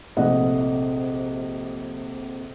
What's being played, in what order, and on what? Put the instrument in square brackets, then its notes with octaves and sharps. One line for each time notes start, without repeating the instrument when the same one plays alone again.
[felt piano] A#1 C3 A3 D#5 F#5